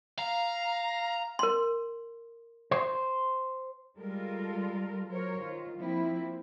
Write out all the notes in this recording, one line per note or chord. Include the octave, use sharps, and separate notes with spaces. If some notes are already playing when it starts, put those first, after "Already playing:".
F5 A#5
A#4 C6
C5
G3 G#3 F4 A4 A#4
F#3 A#4 C5 C#5
D#3 F4
F3 A#3 C4 E4